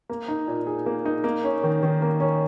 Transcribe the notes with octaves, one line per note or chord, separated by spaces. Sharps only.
A#3
D#4
A#2
G#4
A#3
D#4
A#3
C#4
D#3
D#3
A#3
C#4